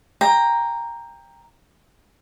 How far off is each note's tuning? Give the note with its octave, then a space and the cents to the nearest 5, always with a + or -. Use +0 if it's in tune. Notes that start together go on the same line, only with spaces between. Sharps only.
G5 +20 A#5 +0